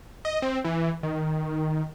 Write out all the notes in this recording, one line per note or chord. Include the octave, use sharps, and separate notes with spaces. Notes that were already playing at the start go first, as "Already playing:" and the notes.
D#5
C4
E3
D#3